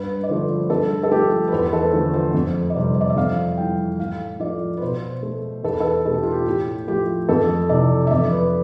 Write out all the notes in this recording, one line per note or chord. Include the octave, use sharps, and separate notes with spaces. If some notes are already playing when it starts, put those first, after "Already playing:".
Already playing: G2 B4
D5
D3 F3 A3 C5
G2 A4
A4
F3 A3 G4
B4
E2 C5
B4
A4
D3 F3 A3
C5
F2
D5
C3 G3 C5
C5
D5
E5
F2 F5
E3 G3 G5
A2 F5
F3 A3 D5
B4
B2 C5
A3
E2 A4
B4
A4
B2 A3 A4
G4
F4
G4
A2 G4
F3 A3 G4
F2 A4
C3 E3 D5
E5
F2 D5
B4